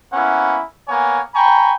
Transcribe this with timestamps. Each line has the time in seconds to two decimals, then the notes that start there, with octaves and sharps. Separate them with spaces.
0.13 A#3 B3 C#4 E4 F#5
0.88 A#3 B3 C#5 G#5
1.35 G5 G#5 A#5 B5 C#6